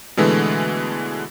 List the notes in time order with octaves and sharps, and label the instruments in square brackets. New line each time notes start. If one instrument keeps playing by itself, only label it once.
[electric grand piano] B2 D3 E3 G#3 A3